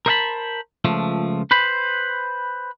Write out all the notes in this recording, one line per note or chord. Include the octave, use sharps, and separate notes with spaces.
A#4 C5 D#5 F#5 A5 B5
C#2 F3 A3
B4 C5 B5